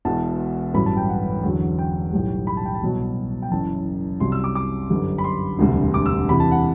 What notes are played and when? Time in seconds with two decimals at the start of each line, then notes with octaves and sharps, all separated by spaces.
0.05 E1 E2 B2 A5
0.74 A1 G2 F#3 B5
0.86 A5
0.97 G5
1.09 F#5
1.43 E2 D3 F#3
1.78 G5
2.13 B1 A2 G3
2.47 B5
2.57 A5
2.65 G5
2.75 A5
2.82 C2 B2 F#3
3.42 G5
3.51 F#1 F#2 E3 A5
4.20 C2 C3 F#3 C6
4.32 E6
4.44 D6
4.55 D6
4.90 G1 F#2 D3 G3
5.18 B5
5.24 C6
5.59 E1 D2 C3 G3
5.94 D6
6.06 E6
6.29 E2 C3 E3 B5
6.40 A5
6.51 F#5